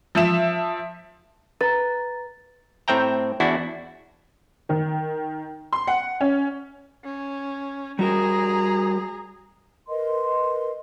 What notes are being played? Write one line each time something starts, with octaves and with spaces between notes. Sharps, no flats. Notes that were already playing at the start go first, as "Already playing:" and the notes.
F3 E5 E7
B4 A#5 A6
A2 C4 E5 G5 A#5
E2 D4 E4 F#4
D#3
C6
F#5
C#4
C#4
G3 F#4 G#4 A#4 A#5
A#4 B4 D#5 C6